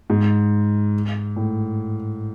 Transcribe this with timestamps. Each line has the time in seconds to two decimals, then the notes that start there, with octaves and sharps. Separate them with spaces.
0.10 G#2
1.36 A2